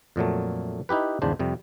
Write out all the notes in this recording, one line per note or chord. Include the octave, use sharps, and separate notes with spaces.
F2 A#2 F#3 A3
D#4 E4 G4 B4
G#1 E2 C#3 D4 C5
F2 C3 G3